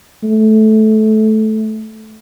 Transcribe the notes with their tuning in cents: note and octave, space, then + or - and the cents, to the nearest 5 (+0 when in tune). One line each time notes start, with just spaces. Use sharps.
A3 -15